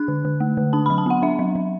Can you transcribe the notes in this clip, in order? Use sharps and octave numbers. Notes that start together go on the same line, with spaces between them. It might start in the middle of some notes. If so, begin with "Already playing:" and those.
Already playing: D4 F#6
D3
D3
A3
D3
D4 A5
F#3 B5
A5
B3 F#5
D4 E5
F#3
F#3